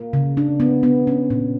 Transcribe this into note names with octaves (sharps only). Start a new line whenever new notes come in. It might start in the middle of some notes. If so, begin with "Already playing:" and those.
Already playing: A#3
C#3
D4
B3
B3
C#4
A#2